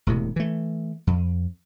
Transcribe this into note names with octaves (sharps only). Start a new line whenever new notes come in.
E1 A2 C3
E3 A3
F2